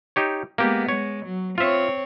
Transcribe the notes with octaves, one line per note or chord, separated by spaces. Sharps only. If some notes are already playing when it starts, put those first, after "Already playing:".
D#4 G4 C#5
G#3 A#3 B3 G4
G#3 C#5
F#3
C4 F4 C#5 E5